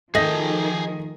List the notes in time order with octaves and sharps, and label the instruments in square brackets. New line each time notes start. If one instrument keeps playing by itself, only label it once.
[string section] D#3 F3 [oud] A3 [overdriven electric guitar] G#4 G5 [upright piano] D#5 A#6